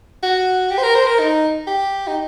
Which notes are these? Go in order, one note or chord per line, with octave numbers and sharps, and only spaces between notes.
F#4
G4
C5
A#4
C5
A#4
D#4
G4
D#4